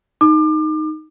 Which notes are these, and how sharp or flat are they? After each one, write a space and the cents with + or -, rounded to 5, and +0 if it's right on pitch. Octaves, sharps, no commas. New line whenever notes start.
D#4 +0 D6 +35